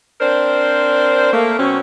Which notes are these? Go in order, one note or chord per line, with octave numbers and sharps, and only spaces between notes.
C4 D4 A#4 C5
A3 A#3
B2 F#3 C4 C#4